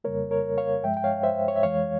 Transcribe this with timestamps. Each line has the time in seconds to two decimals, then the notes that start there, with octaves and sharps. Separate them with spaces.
0.04 F2 C#3 G3 A#3 A#4 C#5
0.31 A#4 C#5
0.58 C#5 F5
0.84 G2 F3 G#3 E5 G5
0.97 G5
1.04 C#5 F5
1.23 C5 E5
1.48 C#5
1.56 E5
1.63 F2 E3 G#3 C#5 F5